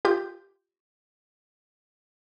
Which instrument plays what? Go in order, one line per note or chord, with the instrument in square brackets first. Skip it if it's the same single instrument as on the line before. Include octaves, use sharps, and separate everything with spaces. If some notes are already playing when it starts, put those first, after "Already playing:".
[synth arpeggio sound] F4 G4 G6